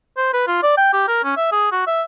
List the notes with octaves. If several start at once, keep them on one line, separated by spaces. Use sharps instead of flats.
C5
B4
F4
D5
G5
G4
A#4
C#4
E5
G#4
F#4
E5